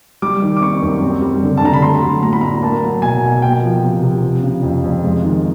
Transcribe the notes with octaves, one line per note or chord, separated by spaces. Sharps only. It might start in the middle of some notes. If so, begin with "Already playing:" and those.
G3 D6
D#3
D6
C4 C#6
F#2
C4
G3
D3
A5
D3 A#5
B5
A3 C6
F#3
A2 A#5
B5
A2 A#5
A#3 A5
F#3
B2 G#5
B2
A#3 G5
F3
C3
C3
F3
C#3
F2
F2
G#3
D#3